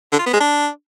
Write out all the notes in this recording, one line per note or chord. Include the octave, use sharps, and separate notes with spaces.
D3
F4
B3
G#3
D4